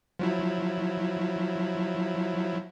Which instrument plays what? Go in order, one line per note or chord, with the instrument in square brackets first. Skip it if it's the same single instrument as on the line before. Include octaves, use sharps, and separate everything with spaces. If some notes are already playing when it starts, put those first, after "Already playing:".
[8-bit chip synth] F3 F#3 E4